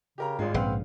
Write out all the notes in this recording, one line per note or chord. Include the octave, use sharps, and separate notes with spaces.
C#3 G4 A#4 A#5
G#1 G#2 G#3 F4
A#1 C#3 C4 B4 F5 F#5